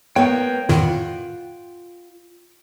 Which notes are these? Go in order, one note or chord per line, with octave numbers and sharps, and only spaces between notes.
A#3 B3 C#5 G5
F2 A2 D#3 F4 F#5